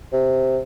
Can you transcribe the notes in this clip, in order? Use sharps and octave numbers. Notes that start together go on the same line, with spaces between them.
C3